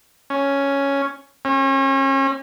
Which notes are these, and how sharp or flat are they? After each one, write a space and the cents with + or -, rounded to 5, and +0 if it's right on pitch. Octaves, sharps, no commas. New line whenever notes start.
C#4 +5
C#4 -35